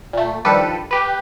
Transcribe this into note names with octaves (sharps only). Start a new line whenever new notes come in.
A#2 A3
D#3 F3 G3 D4 A4 B4
G4 B4